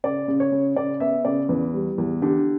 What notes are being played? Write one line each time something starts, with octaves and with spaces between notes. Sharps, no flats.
C#3 D5
C#3
C#5
C#3
C#3 D5
B3 E5
C#3 D5
E2 B4
G3
E2
D3 G4